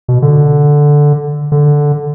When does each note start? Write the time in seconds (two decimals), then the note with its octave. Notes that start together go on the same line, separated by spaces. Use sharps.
0.08 B2
0.22 D3
1.52 D3